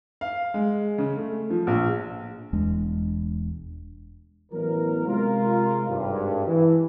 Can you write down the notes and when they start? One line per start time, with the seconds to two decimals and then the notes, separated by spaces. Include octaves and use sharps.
0.21 F5
0.54 G#3
0.98 C#3
1.17 A3
1.50 F3
1.67 A#1
2.53 E1 E2 G#3 D4
4.52 A1 E3 F#3 B3 A#4
5.07 C3 G#3 F4 A#4
5.89 G#1 G2
6.46 E3